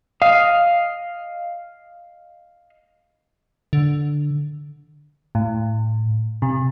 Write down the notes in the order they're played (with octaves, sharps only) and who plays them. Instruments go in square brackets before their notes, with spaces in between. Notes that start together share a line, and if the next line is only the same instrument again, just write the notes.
[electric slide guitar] D#5 F5
[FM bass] D3
[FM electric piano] A2
C3